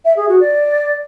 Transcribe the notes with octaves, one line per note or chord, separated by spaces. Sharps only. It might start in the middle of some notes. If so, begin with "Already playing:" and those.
E5
G#4
F#4
D5